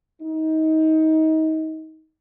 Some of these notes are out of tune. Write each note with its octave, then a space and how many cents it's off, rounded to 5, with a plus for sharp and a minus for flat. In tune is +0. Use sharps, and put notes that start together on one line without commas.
D#4 +25